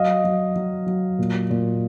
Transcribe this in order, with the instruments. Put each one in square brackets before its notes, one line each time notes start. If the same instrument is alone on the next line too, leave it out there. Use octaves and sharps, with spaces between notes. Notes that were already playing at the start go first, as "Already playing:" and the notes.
Already playing: [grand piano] F#3 D#5 F5
F#3
F#3
F#3
A#2
A#2